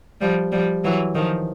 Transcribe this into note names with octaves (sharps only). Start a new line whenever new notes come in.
F3 G3
F3 G3
E3 F#3
D#3 F3